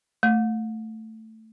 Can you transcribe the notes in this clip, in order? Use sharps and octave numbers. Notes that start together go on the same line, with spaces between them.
A3